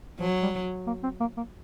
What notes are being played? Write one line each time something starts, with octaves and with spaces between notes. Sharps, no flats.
F3 F#3
G3
A#3
C4
A#3
A#3